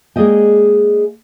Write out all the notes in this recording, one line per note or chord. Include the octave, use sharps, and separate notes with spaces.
G#3 A#3 G#4 D5 D#5 G5